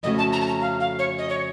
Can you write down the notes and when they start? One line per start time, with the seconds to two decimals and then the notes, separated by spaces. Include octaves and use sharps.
0.03 F2 C#3 A3 C#4 F#4 D#5
0.18 A5
0.33 A#5
0.41 A5
0.47 A#5
0.61 F5
0.80 F5
0.99 C#5
1.18 D#5
1.29 C#5